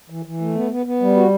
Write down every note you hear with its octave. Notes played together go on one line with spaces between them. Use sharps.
E3
E3
A3
B3
B3
B3
G3
F#4